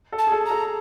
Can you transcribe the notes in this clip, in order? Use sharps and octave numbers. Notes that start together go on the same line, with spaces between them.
A4
A5
G#4
A4
A#5
A4